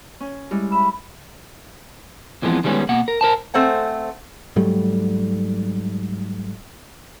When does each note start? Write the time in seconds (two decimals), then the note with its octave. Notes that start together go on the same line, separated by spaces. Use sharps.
0.20 C#4
0.51 G3 G#3 E4
0.72 E5 B5
2.42 E2 E3 F3 G#3 B3 C4
2.64 D#3 G3 G#3 B3 C#4
2.89 B2 A#3 F#5
3.08 A#4
3.21 A#4 C5 A5
3.54 A3 C4 C5 F#5 G#5
4.56 G#2 F#3 G3 A3